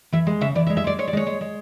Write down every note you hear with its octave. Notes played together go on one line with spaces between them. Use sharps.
E3 E5
G#3
C#3 E5
E3 D5
E5
G#3
E5
G#3 D5
G#3 C#5
D5
G#3 C#5
G#3
G#3